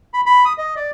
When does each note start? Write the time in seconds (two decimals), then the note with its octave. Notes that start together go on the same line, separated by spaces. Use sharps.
0.14 B5
0.26 B5
0.45 D#6
0.58 D#5
0.76 D5